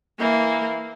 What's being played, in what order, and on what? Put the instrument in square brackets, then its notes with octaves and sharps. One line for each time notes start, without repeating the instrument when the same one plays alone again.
[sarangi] E3 [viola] A#3